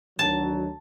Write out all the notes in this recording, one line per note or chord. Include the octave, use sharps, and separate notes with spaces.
D2 D#3 F#3 A5